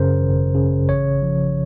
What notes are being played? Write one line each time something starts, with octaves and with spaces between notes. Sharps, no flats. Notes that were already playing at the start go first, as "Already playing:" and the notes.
Already playing: F#2 C#3 A#4 C5
G#1
C#3
A1 C#5
F3